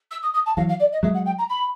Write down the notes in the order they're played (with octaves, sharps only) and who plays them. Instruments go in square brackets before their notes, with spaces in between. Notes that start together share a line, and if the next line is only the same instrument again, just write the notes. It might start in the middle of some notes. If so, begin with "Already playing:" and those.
[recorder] E6
D#6
D#6
A5
[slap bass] E3 F#3 [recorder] F5
[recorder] F5
D5
D#5
[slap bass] F#3 G#3 [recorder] E5
[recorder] F#5
G5
A#5
B5